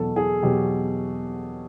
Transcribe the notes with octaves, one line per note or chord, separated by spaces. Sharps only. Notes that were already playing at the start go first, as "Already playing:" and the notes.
Already playing: E2 B2 F#3 A4
G#4
E2 B2 F#3 G4